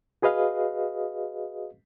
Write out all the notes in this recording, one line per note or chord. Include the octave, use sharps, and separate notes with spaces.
F#4 G#4 B4 D#5 F5